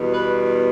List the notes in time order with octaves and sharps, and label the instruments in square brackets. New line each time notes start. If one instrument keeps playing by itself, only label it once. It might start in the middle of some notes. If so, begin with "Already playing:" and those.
Already playing: [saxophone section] E2 B2 G3
B4